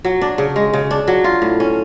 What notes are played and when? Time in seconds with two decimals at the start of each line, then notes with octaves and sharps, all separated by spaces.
0.04 F#3
0.21 D4
0.38 C#3
0.56 G#3
0.73 C#3
0.91 D4
1.08 F#3
1.24 F4
1.42 A2
1.60 C#4